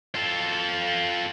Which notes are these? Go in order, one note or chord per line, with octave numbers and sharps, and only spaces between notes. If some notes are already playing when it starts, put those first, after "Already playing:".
F4 A4